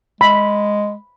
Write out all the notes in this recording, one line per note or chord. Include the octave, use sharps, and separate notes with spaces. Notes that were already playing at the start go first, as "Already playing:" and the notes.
G#3 B5